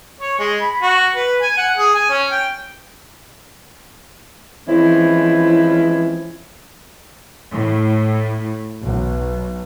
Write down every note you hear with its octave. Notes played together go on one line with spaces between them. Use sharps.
C#5
G#3
B5
F#4
B4
G#5
F#5
G#4
G#5
C#4
G5
E3 F3 G#3 C4 C#4 E4
A2
B1